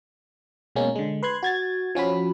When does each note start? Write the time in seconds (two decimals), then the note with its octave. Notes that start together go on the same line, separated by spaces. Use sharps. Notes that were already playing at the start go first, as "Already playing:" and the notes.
0.76 B2 G#3 A#3 C#4
0.96 D3 G#3
1.23 B4 C6 F#6 G#6
1.43 F#4 G#6 A6
1.95 F3 C#4 F#4 B5